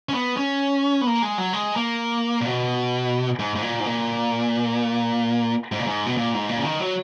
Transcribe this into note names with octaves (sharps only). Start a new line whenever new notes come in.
C#4
B3
C#4
B3
A#3
G#3
F#3
G#3
A#3
A#2
B2
G#2
G#2
A#2
G#2
A#2
G#2
A#2
G#2
B2
A#2
G#2
A#2
C#3
D#3
F#3